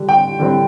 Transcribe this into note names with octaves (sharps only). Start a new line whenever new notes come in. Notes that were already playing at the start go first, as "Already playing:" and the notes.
Already playing: D3 G3
G5
D3 G3 C4 E4